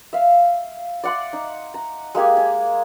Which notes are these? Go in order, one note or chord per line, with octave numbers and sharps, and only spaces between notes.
E5 F5
D5 F#5 C6
D#4
A#5
G#3 A#3 G4 G#5
G#5